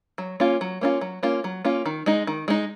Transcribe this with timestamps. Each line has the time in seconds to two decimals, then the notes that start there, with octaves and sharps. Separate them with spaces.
0.18 F#3
0.40 A#3 C#4 F4
0.61 F#3
0.81 A#3 C#4 F4
1.01 F#3
1.23 A#3 C#4 F4
1.44 F#3
1.65 A#3 C#4 F4
1.86 D#3
2.06 G#3 D#4
2.27 D#3
2.48 G#3 D#4